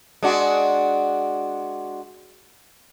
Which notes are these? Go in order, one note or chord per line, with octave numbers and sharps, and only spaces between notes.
G#3 D4 F#4